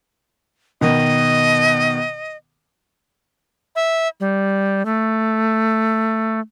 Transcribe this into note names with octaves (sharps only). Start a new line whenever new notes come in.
B2 D#3 D#5
E5
G3
A3